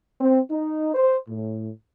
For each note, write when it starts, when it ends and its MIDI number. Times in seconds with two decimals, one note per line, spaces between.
0.20 0.39 60
0.50 0.90 63
0.94 1.16 72
1.28 1.69 45